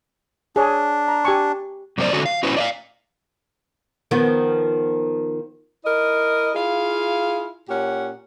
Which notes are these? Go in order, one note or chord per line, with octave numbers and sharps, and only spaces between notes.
D4 G#4 C#5
A#5
G4 G#5 C#6
F#2 C3 A#3 F#4 C5 D5
D3 C#4 F#4 A4
F5
C#4 E4 F#4 B4 C5
D5 D#5 F5
D#3 F3 B3
E4 A#4 D#5
E4 F4 G#4 F5
A#2 C#4 G4 F#5